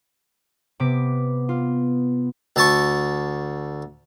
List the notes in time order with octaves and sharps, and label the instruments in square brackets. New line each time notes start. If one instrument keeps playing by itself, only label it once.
[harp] C3 D6 B6 [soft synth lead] B3
[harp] F4
[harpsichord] D2 A5 C#6